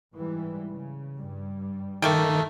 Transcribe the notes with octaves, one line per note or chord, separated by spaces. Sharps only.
G#2 E3 G3
C#3
G2 G3
D#3 A3 A#3 G5